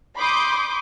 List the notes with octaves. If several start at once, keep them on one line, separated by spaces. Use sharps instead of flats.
B5 C6 D6 D#6 G6